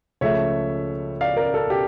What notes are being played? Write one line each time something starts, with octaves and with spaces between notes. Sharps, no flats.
C#2 C#3 F3 A3 C#5 E5
D5 F5
A#4 D5
A4
G4